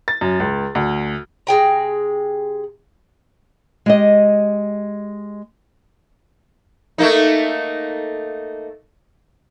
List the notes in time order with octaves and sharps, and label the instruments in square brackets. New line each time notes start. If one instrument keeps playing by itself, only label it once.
[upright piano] A6
F#2
C#2
D2
[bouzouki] C3 G#4 G5 A#5
[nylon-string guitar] G#3 G4 D#5
[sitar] A3 A#3 D#4